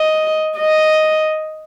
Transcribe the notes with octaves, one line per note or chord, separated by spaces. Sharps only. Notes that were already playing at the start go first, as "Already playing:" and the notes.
Already playing: D#5
D#5